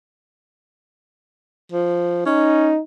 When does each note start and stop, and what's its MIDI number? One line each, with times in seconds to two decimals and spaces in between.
1.72 2.22 53
2.26 2.73 61
2.26 2.80 63